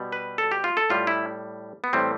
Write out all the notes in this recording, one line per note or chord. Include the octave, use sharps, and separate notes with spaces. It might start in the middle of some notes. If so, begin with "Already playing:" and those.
Already playing: B2 G3
B4
A4
G4
F4
A4
A2 G3 F4
E4
B3
A2 E3 G3 C4